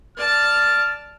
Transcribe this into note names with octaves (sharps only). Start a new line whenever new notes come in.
D5 A5 F6